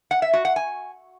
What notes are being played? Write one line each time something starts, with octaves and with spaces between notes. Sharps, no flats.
F#5
E5
F#4
F#5
G#5